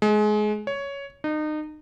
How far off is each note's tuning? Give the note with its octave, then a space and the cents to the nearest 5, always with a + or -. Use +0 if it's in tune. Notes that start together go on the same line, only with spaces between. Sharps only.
G#3 +25
C#5 +10
D#4 -30